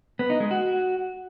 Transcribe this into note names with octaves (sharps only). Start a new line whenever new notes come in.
B3
D#4
G#3
F#4